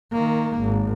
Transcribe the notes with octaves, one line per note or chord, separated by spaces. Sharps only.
D#3 A#3
G#1